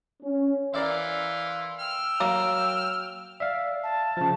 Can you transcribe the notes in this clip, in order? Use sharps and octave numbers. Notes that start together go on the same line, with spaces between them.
C#4
E3 A#4 D5 E5 F5 C6
G5 E6 F6
F#3 A#3
D5 E5 F5
A5
C#3 F3